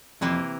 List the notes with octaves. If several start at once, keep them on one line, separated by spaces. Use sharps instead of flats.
F2 C3 E3 A#3